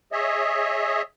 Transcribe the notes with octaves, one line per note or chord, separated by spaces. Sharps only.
G#4 C#5 D#5 E5